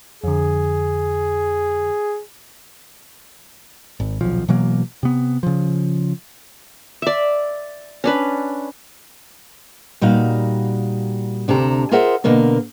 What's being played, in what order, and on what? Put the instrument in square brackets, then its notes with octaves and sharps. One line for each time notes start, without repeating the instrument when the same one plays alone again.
[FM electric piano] F2 D3 [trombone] G#4
[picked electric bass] G#1
D#1 B1 F3
B2 E3 F#3 A#3
C3 B3
C#3 F3
[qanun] D5 E5
C#4 D4 B4
[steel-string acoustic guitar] A#2 G3 D#4 F#4 F5
D2 C3 D4 A4 A#5
F4 G#4 A#4 C5 E5 F#5
B2 D3 A#3 A#4